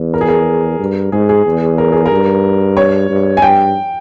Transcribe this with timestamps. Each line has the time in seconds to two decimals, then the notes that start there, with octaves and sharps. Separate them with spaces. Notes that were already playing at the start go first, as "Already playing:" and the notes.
Already playing: E2
0.14 A#4
0.21 G#4
0.29 A#4
0.79 G2
1.12 G#2 G#4
1.29 G#4
1.46 E2
1.78 A#4
1.92 G#4
2.06 A#4
2.11 G2
2.77 C#5
3.10 G2
3.37 G#5
3.42 G2 G5